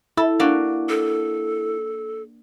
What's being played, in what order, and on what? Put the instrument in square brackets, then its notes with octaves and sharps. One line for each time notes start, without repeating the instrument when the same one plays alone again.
[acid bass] E4 [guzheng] A4
[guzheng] A#3 D4 F#4
[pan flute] A4